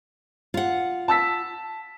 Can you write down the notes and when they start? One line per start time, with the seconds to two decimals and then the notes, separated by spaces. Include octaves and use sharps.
0.54 F4 F#5
1.08 A5 E6 B6